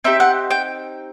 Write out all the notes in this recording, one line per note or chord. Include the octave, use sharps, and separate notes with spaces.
C4 D#4 G4 E5
F#5
G5